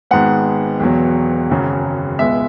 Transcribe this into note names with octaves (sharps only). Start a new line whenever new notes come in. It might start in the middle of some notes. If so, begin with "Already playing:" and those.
G#1 G#2 G#3 B3 F#5
E1 E2 B2 F#3
G#1 F#2 C#3 F#3
C#2 B2 G#3 B3 E5